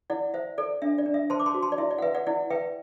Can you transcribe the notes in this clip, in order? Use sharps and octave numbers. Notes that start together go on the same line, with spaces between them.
E4 D5 F#5
C5 E5
A4 D5
D4 E5
D5
D4
E5
C5 A5 C6
D6
A5 C6
F#4
A5 C6
D5
E4 E5
D5
F#5
B4 E5
D5 F#5
E4 D5 F#5
B4 E5 G5